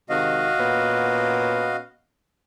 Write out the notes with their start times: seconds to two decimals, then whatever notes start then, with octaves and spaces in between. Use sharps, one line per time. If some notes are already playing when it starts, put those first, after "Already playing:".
0.10 C3 D#3 G#3 F#4 D#5 F5
0.58 A#2 B3 C#4